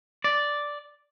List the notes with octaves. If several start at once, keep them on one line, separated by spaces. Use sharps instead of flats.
D5